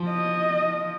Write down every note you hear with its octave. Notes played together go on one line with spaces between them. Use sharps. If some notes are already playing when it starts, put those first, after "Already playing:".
Already playing: F3
D#5